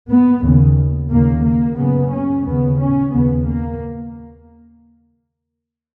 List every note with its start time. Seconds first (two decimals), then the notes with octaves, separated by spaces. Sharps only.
0.10 B3
0.44 D#2 C#3
1.11 D#2 C#3 A#3
1.46 A#3
1.78 F#2 C#3 B3
2.13 C#4
2.46 D#2 C#3 B3
2.80 C#4
3.13 D#2 C#3 B3
3.47 A#3